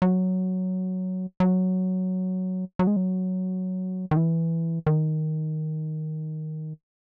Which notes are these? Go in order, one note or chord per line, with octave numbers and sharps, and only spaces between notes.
F#3
F#3
F#3
G#3
F#3
D#3
E3
D#3